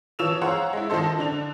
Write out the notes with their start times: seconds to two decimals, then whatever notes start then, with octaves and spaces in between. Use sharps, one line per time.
0.19 E3 F3 C#5 E6 E7 F7
0.41 G#4 C5 C#5 F5 F#5 A#5
0.73 G#3 E4
0.90 D#3 F3 D#4 A4 C5
1.19 D3 D4 F7